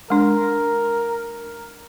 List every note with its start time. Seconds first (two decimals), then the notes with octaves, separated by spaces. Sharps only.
0.10 G#3 D4 A#4